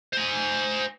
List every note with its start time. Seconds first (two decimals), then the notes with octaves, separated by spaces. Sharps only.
0.13 C5 G#5